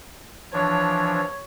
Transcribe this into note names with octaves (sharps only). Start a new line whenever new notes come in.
E3 F3 D4 C#5